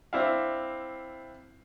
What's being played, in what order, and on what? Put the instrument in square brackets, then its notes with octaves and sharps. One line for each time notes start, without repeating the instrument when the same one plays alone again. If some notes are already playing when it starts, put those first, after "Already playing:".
[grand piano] C4 D4 E4 E5 F5